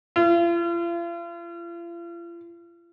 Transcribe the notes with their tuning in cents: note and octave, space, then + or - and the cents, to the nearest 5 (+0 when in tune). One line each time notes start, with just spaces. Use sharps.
F4 -40